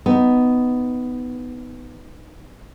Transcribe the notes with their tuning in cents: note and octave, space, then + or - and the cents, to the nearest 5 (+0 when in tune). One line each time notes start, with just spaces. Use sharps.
B3 +10 D#4 +0